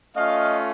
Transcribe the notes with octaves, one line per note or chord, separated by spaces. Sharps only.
A3 C#4 F4 D#5 F5